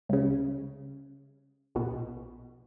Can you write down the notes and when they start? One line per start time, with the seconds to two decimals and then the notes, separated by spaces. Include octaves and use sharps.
0.09 C#2 C#3
1.75 A#1 B2